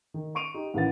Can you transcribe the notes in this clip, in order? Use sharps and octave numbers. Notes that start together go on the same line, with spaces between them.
D#3
C6 C#6 D7 D#7 F7
D#4 G4
A1 D#3 B4 F5 F#5 A6